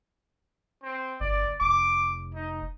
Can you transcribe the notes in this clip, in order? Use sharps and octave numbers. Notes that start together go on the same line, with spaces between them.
C4
G1 D5
F1 D6
D#4